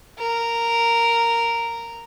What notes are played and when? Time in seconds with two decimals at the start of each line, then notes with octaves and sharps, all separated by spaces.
0.18 A#4